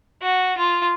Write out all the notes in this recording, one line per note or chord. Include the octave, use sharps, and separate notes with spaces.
F#4
F4